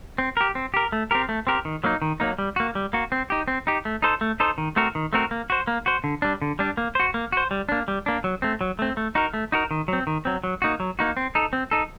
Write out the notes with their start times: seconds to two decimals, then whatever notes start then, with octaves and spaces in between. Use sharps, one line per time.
0.18 C4
0.37 G4 A#4
0.55 C4
0.74 G4 A#4
0.92 A3
1.11 C4 G4 A#4
1.29 A3
1.47 C4 G4 A#4
1.65 D#3
1.84 F#3 A#3 D#4
2.02 D#3
2.20 F#3 A#3 D#4
2.39 G3
2.56 A#3 F#4
2.75 G3
2.93 A#3 F#4
3.12 C4
3.30 D#4 G4
3.48 C4
3.67 D#4 G4
3.85 A3
4.02 D#4 A4 C5
4.21 A3
4.40 D#4 A4 C5
4.58 D#3
4.76 A3 C4 F#4 A#4
4.95 D#3
5.13 A3 C4 F#4 A#4
5.31 A#3
5.50 F#4 C5
5.67 A#3
5.86 F#4 C5
6.04 D3
6.22 G3 D4
6.42 D3
6.59 G3 D4
6.77 A#3
6.95 F#4 C5
7.14 A#3
7.32 F#4 C5
7.51 G3
7.69 A#3 D4
7.88 G3
8.06 A#3 D4
8.24 F#3
8.42 A3 C4
8.61 F#3
8.79 A3 C4
8.97 A3
9.15 D#4 F#4 A#4
9.34 A3
9.52 D#4 F#4 A#4
9.71 D#3
9.88 F#3 C4
10.07 D#3
10.25 F#3 C4
10.44 F#3
10.62 A#3 D#4 F#4
10.80 F#3
10.99 A#3 D#4 F#4
11.17 C4
11.35 D#4 A4
11.53 C4
11.71 D#4 A4